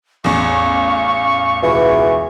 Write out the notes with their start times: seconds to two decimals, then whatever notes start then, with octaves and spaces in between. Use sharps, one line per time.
0.24 A1 E2 F5 C#6
1.63 C#2 B2 E3